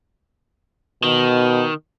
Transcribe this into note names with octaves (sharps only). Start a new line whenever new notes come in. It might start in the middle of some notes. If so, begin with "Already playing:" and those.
B2 D#3